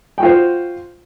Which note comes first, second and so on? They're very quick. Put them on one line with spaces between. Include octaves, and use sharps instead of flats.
G5 F#4 F4 C5